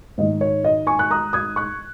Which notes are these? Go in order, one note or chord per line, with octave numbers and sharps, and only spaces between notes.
G#2 D#3 D#5
C#5
D#5
G#5 C#6
F#6
A#5 D#6
D#6 G#6
C#6 F#6